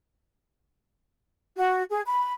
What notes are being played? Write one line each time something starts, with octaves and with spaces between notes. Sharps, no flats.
F#4
G#4
B5